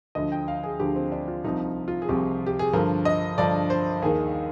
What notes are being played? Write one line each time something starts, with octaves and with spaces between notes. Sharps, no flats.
D2 D3 F3 D#5
G5
F5
G#4
D2 D3 F3 G4
C4
D4
F4
C2 C3 F3 D#4
F4
G#4
C2 C3 F3 G4
G4
G#4
G2 D3 F3 A#4
D#5
G2 D3 F3 D5
C5
D#2 D#3 G#4